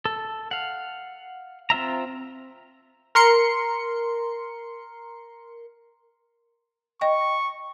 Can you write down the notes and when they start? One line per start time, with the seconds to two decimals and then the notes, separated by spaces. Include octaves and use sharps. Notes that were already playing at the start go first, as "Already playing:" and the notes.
0.05 A4
0.51 F5 F#5
1.70 C4 F4 E5 A#5
3.15 A#4 C6 C#7
7.01 D#5 G5 C#6